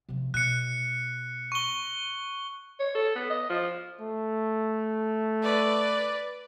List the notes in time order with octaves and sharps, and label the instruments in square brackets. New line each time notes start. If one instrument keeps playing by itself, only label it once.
[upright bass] C3 F3
[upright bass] B2 [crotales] F#6 C#7
[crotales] C#6 G7
[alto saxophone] C#5
A4
B3
D#5
F3
[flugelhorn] A3
[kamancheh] B4 D5